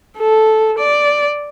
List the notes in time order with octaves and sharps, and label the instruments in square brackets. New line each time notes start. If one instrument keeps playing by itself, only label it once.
[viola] A4
D5